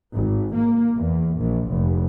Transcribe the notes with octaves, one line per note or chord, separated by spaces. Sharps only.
G#1
A#3
E2
A#1
F1